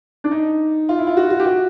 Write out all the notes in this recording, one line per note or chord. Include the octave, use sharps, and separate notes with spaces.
D4
D#4
F4
E4
F4
F#4
F#4
G4
F#4